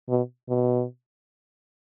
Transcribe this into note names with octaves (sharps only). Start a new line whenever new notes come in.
B2
B2